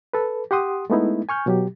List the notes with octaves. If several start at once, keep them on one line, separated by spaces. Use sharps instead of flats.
A4 B4
G4 F#5 C6 D#6
G#3 A3 B3 D#4 E4
G#5 C#6 F6 G6
B2 F#3 G4